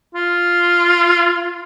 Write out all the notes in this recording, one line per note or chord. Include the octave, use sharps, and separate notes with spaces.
F4